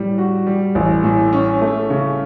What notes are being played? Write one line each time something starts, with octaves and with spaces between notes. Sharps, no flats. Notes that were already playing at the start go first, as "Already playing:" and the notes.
Already playing: A2 G3
F#4
G3
A1
A2
C#4
A3
C#3